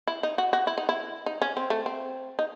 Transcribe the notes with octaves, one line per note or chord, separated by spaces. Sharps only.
E4
D#4
F#4
F#4
E4
D#4
E4
D#4
C#4
C4
A3
C4
D#4